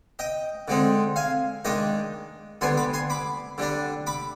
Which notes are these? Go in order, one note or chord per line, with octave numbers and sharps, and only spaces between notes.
D#5 G5
D3 G#3 C4 D#4
F5 G#5
D#3 G#3 D4 D#5 G5
D3 G3 B3 G#5 C6
B5 D6
G#5 C6
B5 D6
D3 G3 D4
B5 D6